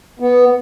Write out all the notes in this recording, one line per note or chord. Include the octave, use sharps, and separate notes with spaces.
B3